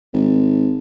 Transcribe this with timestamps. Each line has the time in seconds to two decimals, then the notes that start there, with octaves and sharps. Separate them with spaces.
0.13 G#1